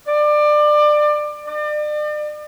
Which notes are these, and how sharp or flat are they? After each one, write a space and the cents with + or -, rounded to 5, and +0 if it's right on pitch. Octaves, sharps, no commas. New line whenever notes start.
D5 +25
D5 +40